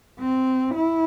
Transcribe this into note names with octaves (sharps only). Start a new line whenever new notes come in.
C4
E4